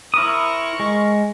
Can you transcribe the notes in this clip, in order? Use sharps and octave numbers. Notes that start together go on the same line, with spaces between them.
C4 E4 A#4 C#6 D#6
G#3